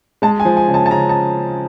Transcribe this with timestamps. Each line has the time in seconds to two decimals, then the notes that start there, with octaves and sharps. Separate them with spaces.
0.22 G#3 A5
0.40 G#5
0.45 F3
0.57 G#5
0.68 C#3
0.74 A5
0.86 A5
0.91 C#3 A#5
1.09 A5